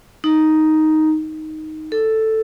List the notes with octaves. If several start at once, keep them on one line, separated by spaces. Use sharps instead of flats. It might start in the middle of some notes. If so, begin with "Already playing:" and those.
D#4
A4